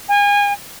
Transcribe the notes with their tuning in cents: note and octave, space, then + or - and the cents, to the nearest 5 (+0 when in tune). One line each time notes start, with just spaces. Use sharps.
G#5 -35